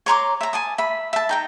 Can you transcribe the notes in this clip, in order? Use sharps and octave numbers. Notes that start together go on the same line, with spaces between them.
C#5 A#5 C6 D6
E5 A#5
G#5 A5 D#6
E5 B5
E5 A5
D#4 G5 A#5